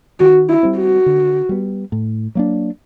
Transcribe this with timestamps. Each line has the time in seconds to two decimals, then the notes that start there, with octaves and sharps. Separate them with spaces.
0.20 D#3 F#4
0.49 E4
0.63 G3 C4
0.78 F#4
1.06 D3
1.49 G3 B3
1.92 A2
2.35 F#3 A#3 D4